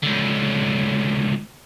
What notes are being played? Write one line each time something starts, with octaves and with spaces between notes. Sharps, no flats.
C#2 D3